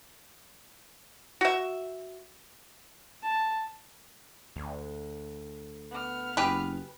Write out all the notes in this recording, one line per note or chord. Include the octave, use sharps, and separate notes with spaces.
F#4 E5
A5
D2
B3 F6
F#1 G4 G#4 B4